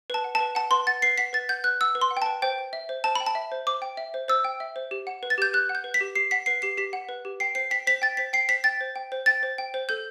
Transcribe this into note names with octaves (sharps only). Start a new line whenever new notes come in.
B4 A5
F#5
A5
B4
F#5 A5
B4 C6
F#5 A6
B4 C7
F#5 B6
B4 A6
F#5 G6
B4 F#6
F#5 E6
B4
C6
F#5
G5
B4 A5
C5 G5
G5
E5
C5
C5 A5
G5 B5
A5
E5
C5
C5 D6
G5
E5
C5
C5 E6
G5
E5
C5
G4
F#5
B4
A6
G4 G6
G4 F#6
F#5
G6
B4
B6
G4
G4 C7
F#5 B6
B4 C7
G4 C7
G4 B6
F#5
B4
G4
G5 C7
C5 C7
G5 B6
C5 B6
G5 A6
C5 B6
G5 C7
C5 B6
G5 A6
C5
G5
C5
G5 A6
C5
G5
C5
A4 G6